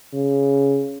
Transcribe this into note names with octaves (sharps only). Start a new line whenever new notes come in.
C#3